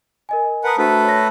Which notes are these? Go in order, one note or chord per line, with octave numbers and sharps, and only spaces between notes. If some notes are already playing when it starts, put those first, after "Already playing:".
A#4 D#5 G#5
A#4 B4 F#5 A5 D#6
A3 D4 F#4 A4 B4 C5
C#5 B5 A#6